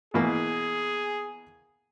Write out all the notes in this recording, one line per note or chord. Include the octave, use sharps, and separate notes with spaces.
B2 E3 A#3 G#4